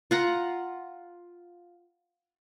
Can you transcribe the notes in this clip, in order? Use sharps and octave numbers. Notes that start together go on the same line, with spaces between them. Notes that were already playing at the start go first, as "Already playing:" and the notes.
F4 F#5 A#5